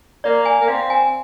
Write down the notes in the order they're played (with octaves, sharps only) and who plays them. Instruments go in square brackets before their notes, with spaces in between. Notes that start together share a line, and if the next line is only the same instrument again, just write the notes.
[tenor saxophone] A#3 [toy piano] D5
[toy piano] G#5
[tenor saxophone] A#3
[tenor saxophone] C4 [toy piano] F5
[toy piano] G#5